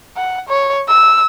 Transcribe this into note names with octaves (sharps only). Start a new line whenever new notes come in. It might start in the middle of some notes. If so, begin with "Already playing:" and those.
F#5
C#5
E6